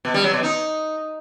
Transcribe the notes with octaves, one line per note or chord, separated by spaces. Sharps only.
B2
G3
F#3
B2
D#4